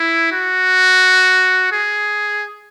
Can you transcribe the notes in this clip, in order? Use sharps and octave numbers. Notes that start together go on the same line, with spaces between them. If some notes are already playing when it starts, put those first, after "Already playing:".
Already playing: E4
F#4
G#4